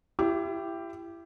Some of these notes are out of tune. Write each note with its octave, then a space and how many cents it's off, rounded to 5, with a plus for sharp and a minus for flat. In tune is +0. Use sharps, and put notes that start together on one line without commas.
E4 +30 G4 +0